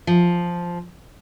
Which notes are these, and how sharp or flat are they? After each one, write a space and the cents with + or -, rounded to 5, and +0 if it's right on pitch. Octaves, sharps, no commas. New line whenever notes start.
F3 +0